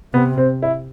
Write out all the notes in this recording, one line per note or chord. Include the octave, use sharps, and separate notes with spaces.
C3 B3
C4
E4